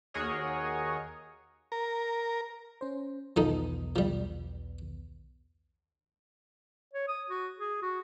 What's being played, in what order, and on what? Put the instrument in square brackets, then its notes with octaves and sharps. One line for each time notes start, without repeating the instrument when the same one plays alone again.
[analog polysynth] D#2 F#4 G#4 A#4 C#5 D#5
[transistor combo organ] A#4
[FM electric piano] C#4 C5
[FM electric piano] B1 E2 B3 [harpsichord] F3 D#4 A4
[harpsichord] F3 G3
[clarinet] C#5
D#6
F#4
G#4
F#4